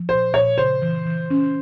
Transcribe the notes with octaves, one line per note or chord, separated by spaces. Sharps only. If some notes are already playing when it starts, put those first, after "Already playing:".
Already playing: F3
A#2 C5
A#2 C#5
C#3 C5
E3
E3
C#4